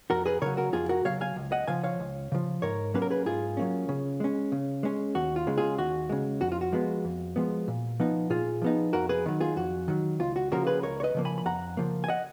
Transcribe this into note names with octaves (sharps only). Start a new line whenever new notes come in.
F2 F#4 A#4
G#4 B4
C#3 F#3 A#4 C#5
F#4 A#4
F2 F4 G#4
F#4 A#4
C#3 F#3 C#5 F5
F5 G#5
C#2
D#5 F#5
C#3 F3 F5 G#5
C#5 F5
C#2
C#3 F3
G#2 A#4 C#5
F#3 A#3 C#4 B4
A#4
G#4 B4
G#2 F4 G#4
F#3 A#3 C#4
C#3
G#3 C#4
C#3
G#3 C#4
D#2 F#4
F4
C#3 G#3
F4 G#4
D#2 F#4
C#3 G#3
F2 F#4
F4
F#4
F3 G#3 B3
F2
F3 G#3 B3
A#2
F3 B3 D#4
A#2 F4 G#4
F3 B3 D#4
F2 F#4 A#4
G#4 B4
D#3 F#3
F4 G#4
F2 F#4
D#3 F#3
C#2 F4
F#4
C#3 F3 A#3 F#4 A#4
G#4 B4
C#2 A#4 C#5
C#5
B4 D#5
C#3 F3 A#3
G#5 B5
B5
F2 F#5 A#5
C#3 F3 A#3
G#5
D#5 F#5